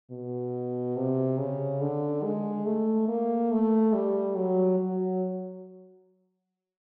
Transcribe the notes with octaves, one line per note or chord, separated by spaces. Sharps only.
B2
C3
C#3
D3
G#3
A3
A#3
A3
G3
F#3
F#3